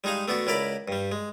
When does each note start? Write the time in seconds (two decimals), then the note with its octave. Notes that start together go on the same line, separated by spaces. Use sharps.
0.04 G3 G#3 D#4 G#4 F5
0.28 A3 B3 D4 F#4
0.47 C#2 E4 A#4 D5 B5
0.88 G2 G3
1.12 G#3